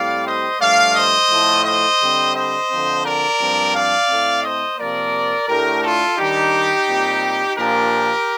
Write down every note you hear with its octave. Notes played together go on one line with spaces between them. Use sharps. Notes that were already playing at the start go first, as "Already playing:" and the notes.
Already playing: A2 G3 C4 D5 F5
C5 D#5
G2 F3 A3 D5 F5
C5 D#5
A2 F3 A3
C5 D#5
D3 G3 C4
C5 D#5
D3 F3 C4
A#4 D5
G2 F3 C4
D5 F5
A2 A3 C4
C5 D#5
C3 F3 A#3 A#4 D5
A2 A3 D4 G4 A#4
F4 A4
D#3 G3 D4 D#4 G4
A#2 G3 C4
A#2 F3 A#3 D4 G4 A#4